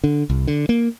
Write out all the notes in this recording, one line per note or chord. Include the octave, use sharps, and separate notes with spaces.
D3
C2
D3
A#3